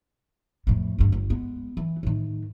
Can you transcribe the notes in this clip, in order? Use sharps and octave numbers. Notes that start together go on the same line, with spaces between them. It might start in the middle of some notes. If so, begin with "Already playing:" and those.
F2 A2
D2 G2
G1
G#3 B3
E3
A2 D#3